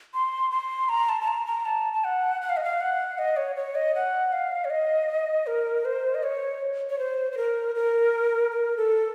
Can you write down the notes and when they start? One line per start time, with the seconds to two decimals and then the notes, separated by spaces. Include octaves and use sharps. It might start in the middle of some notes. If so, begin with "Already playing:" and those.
0.14 C6
0.51 C6
0.89 A#5
1.09 A5
1.21 A5
1.28 A#5
1.46 A#5
1.65 A5
1.93 A5
2.04 F#5
2.42 F#5
2.49 F5
2.57 D#5
2.64 F5
2.81 F#5
3.18 D#5
3.37 C#5
3.56 C#5
3.75 D#5
3.95 F#5
4.33 F5
4.65 C#5
4.70 D#5
5.47 A#4
5.85 C5
6.15 D#5
6.23 C#5
6.90 C#5
6.99 C5
7.32 C5
7.37 A#4
7.75 A#4
8.51 A#4
8.77 A4